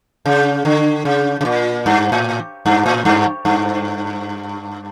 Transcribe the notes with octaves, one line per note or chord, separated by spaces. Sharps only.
C#3
D3
C#3
C#3
A#2
G2
A2
G2
A2
G2
G2